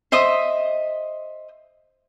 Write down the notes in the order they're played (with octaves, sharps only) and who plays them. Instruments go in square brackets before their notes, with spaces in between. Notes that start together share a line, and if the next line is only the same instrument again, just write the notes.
[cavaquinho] C5 D#5 E5 D#6